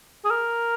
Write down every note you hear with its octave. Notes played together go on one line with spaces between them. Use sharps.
G#4
A#4